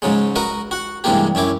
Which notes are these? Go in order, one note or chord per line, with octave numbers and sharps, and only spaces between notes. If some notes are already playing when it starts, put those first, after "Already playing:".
G#2 C#3 F#3 G#3
F#4 A#4 B4 D#5
F#4 F#5
G2 C3 E3 G#3 A#3 G4
F#2 C#4 E4 D6